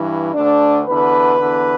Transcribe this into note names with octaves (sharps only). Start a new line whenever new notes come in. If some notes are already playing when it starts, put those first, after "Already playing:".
Already playing: G2 E3
D2 D3 D4
E2 D3 B4
E2 D3